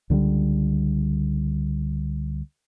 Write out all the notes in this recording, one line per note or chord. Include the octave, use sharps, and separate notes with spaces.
C#2 D3 F3 G3